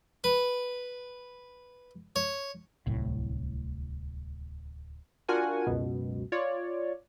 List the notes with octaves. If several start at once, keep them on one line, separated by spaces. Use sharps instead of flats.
B4
C#5
D1 C2 A2
D4 F4 F#4 A#4 F#5 G#5
C#2 F#2 B2
F4 C#5 D5